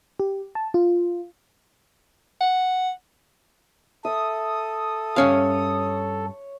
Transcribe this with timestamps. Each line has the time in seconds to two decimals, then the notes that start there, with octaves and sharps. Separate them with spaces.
0.20 G4
0.55 A5
0.74 F4
2.41 F#5
4.05 A4 E5 D#6
5.16 G2 C#4 C#5 F5